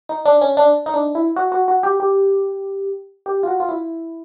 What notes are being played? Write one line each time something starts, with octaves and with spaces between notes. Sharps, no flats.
D#4
D4
C#4
D4
D#4
D4
E4
F#4
F#4
F#4
G4
G4
G4
F4
F#4
F4
E4